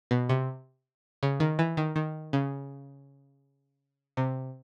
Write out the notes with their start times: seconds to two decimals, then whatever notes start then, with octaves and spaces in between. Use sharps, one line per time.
0.11 B2
0.29 C3
1.23 C#3
1.40 D#3
1.59 E3
1.77 D#3
1.96 D#3
2.33 C#3
4.17 C3